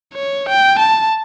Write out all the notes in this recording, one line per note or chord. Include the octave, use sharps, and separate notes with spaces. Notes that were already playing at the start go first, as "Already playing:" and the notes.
C#5
G5
A5